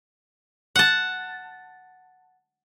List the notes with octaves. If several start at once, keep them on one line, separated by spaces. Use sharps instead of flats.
F#5 A5